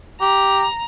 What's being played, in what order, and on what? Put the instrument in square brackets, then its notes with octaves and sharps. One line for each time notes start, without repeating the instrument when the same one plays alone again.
[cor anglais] G4 [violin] A#5